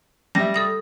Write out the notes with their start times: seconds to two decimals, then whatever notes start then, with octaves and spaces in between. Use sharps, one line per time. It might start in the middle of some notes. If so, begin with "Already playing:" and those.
0.35 G3 E5 A#6
0.54 A4 D#6 A#6